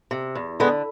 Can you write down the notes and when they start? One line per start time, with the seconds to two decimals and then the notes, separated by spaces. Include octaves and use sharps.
0.11 C3
0.35 E2
0.60 D3 G#3 B3